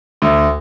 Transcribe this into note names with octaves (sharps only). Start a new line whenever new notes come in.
D2